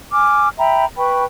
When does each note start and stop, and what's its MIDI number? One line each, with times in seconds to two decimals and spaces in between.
0.12 0.48 80
0.12 0.48 86
0.12 0.48 89
0.58 0.84 76
0.58 0.84 79
0.58 0.84 82
0.58 0.84 83
0.97 1.24 71
0.97 1.24 79
0.97 1.24 83
0.97 1.24 85